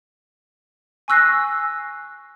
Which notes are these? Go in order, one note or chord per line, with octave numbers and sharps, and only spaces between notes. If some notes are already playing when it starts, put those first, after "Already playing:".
G#5 C#6 E6 F#6 A#6 C7